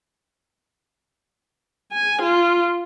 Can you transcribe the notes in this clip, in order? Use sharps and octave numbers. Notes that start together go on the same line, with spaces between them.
G#5
F4